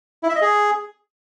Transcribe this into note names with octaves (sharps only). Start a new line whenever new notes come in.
E4
E5
D#5
G#4